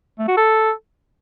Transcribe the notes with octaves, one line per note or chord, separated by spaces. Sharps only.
A3
F#4
A4